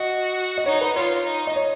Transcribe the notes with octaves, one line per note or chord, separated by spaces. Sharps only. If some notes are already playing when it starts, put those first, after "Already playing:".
Already playing: F#4 D#5
D#5
D#4 C#5
B4
F4 C#5
D#4
D#5
C#5